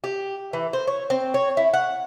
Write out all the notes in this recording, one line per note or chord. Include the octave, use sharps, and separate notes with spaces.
G4
E3
C5
C#5
C4
C#5
E4
F#5